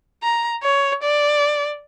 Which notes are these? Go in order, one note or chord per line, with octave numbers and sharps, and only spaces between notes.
A#5
C#5
D5